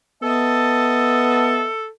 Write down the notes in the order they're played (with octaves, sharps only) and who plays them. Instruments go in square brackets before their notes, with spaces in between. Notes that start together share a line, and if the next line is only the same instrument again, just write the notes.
[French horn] B3 [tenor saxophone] A4 [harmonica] D#5 E5 A5